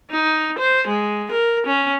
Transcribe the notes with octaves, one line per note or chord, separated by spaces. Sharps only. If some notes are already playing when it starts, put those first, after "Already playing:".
D#4
C5
G#3
A#4
C#4